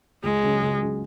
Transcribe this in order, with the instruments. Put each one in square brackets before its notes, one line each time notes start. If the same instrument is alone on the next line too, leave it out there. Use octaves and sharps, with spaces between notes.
[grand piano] C#2 [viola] G#3
[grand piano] C#3 F#3 C#4 G#4
C#2
C#3 F#3 C#4 G#4